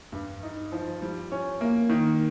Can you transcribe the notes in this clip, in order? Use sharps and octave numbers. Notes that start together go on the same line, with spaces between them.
G2
D#4
F3
G3
C#4
A#3
D#3